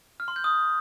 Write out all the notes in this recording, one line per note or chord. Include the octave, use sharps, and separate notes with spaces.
F6
C6
G6
D#6